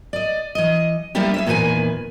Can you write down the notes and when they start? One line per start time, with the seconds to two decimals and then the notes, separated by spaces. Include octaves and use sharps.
0.13 D5 D#5
0.55 E3 D#5
1.15 G3 A#3 B3 D4 E4 G4
1.34 G#4 C#5 E5
1.46 E2 A#2 D#3 F#4 B4 G#5